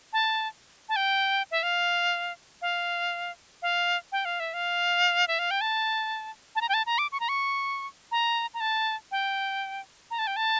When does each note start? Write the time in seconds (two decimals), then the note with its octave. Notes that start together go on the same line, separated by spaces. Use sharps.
0.13 A5
0.89 A5
0.96 G5
1.51 E5
1.63 F5
2.62 F5
3.62 F5
4.12 G5
4.25 F5
4.40 E5
4.54 F5
5.28 E5
5.39 F5
5.51 G5
5.61 A5
6.56 A5
6.61 A#5
6.69 G5
6.74 A5
6.86 A#5
6.98 D6
7.12 C#6
7.20 A#5
7.29 C#6
8.12 A#5
8.54 A#5
8.60 A5
9.11 G5
10.11 A#5
10.19 A5
10.27 G5
10.36 A5